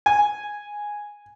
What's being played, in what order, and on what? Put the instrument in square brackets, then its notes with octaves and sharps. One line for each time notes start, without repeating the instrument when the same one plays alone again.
[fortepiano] G#5